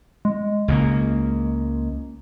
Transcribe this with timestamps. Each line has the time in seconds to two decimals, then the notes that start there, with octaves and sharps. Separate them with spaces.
0.25 G#3
0.68 C#2 C#3 A#3